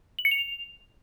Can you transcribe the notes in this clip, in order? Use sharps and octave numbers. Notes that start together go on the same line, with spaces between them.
F#7
C#7
F7